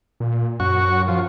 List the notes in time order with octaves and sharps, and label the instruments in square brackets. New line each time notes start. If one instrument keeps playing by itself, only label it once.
[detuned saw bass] A#2
[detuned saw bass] F#2 [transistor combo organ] F#4 C#6
[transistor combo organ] F3